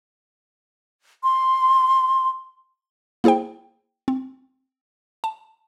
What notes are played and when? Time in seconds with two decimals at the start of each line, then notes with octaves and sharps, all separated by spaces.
1.23 C6
3.24 A#3 E4 G#4 C5 G5
4.08 C4
5.24 A5